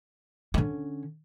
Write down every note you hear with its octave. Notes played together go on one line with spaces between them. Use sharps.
D3 C#4